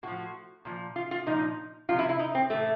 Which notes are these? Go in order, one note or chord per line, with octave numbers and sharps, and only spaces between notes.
A2 F3 F#4
A#2 F3
F4
F4
A#2 F3 D#4
C3 F3 F4
E4
E4
D#4
C4
A2 E3 A3